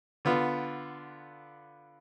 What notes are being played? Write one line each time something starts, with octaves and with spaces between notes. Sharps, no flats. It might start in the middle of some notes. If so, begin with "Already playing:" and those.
D3 B3 F4